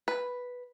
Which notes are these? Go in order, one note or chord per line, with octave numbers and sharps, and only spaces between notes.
B4